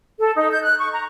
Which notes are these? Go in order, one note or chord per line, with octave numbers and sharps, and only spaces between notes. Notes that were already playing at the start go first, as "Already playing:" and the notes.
A4
D#4
G6
F#6
C#6
A#5